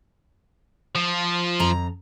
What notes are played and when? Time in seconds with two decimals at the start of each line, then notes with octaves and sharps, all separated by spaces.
0.95 F3
1.59 F2 A#5